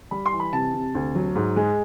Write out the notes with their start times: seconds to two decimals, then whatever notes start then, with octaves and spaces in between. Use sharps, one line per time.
0.11 G3 B5
0.26 C6
0.32 E3
0.40 B5
0.53 C3 A5
0.74 C3
0.95 D2
1.15 F#3
1.36 G#2
1.56 G#3